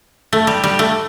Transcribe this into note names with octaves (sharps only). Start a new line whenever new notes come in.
A3
G3
G3
A3